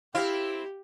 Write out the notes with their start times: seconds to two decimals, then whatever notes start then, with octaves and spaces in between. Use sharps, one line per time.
0.15 C4 E4 G4 F5